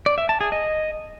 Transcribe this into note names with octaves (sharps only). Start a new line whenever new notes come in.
D5
E5
A5
G#4
D#5